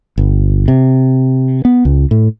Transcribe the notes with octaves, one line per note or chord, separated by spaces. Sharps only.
G1
C3
B3
C#2
A2